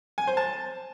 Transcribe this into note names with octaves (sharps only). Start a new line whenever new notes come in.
G#5
C5
A5